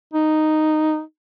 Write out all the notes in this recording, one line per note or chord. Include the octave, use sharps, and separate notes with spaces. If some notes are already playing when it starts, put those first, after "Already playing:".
D#4